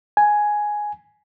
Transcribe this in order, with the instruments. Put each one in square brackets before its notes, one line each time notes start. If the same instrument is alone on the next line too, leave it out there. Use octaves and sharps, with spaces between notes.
[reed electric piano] G#5